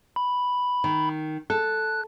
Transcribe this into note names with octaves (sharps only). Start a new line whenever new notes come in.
B5
D#3
A4 F#6